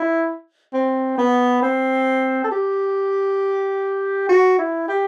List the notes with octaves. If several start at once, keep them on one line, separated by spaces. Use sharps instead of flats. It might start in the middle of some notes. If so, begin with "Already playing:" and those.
Already playing: E4
C4
B3
C4
A4
G4
F#4
E4
G4